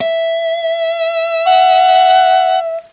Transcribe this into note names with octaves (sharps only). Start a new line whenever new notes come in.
E5
F#5